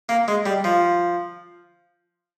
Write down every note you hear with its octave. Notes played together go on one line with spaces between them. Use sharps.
A#3
G#3
G3
F3